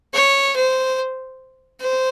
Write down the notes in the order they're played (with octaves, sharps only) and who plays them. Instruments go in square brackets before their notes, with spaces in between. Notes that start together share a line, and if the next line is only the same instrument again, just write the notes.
[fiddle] C#5
C5
C5